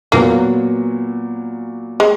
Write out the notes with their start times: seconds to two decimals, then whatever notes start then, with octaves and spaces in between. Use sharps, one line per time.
0.12 A#2 F#3 A#3 B3 F#4
2.00 G#3